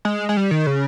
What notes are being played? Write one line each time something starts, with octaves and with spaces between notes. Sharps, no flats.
G#3
G#3
G3
D#3
C#3